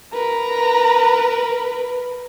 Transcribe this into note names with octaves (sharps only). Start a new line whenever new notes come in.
A#4 B4 A#5